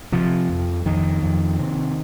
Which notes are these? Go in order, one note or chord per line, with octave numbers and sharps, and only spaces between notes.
C3 F3
F2
F2 D#3
F2
C3